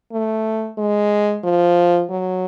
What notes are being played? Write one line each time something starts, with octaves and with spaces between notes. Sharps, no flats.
A3
G#3
F3
F#3